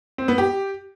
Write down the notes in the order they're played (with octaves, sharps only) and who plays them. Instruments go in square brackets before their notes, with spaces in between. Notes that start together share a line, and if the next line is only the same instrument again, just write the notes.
[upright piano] C4
B3
G4